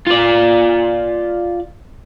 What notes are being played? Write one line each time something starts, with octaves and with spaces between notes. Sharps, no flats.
F4 D5